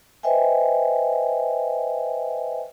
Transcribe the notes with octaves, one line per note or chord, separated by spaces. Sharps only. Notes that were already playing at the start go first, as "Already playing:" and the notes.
B4 C5 D#5 E5 G5 G#5